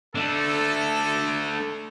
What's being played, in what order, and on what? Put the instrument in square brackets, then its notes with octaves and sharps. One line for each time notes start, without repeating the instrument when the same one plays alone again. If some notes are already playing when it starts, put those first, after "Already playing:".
[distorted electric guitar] A3 D4 [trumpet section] A4